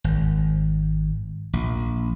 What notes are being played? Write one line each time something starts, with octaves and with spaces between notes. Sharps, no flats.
G#1
A#1